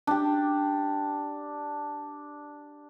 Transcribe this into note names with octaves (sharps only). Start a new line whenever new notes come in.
D4 G4